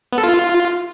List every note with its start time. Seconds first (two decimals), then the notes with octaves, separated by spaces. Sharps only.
0.13 B3
0.18 A4
0.23 F4